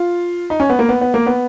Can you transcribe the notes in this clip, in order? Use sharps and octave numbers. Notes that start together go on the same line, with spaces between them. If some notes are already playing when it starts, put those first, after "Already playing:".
Already playing: F4
D#4
C#4
B3
A#3
B3
B3
A#3
B3